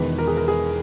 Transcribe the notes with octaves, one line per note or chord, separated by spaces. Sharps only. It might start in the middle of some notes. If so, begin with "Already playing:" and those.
Already playing: E1 E2 D#3 B4
A#4
G#4
A#4
G#4